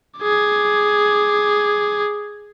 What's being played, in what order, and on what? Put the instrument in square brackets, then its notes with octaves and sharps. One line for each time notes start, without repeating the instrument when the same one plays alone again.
[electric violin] G#4 D6